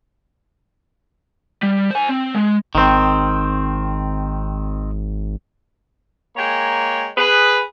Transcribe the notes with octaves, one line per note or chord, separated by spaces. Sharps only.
G3
C5 G#5
C4
G#3
G#1 D#3 C4
G#3 A#3 C#5 G5 G#5 A#5
G#4 B4